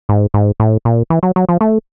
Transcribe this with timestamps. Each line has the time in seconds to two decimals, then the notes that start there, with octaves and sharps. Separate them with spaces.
0.09 G#2
0.34 G#2
0.60 A2
0.85 A#2
1.10 E3
1.23 F#3
1.36 F#3
1.49 F3
1.61 A3